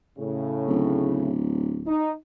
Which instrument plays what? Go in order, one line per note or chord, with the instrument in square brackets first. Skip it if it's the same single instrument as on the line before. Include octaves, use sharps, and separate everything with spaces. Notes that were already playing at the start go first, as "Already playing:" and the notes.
[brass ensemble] A2 C#3
[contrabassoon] D1
[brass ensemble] D#4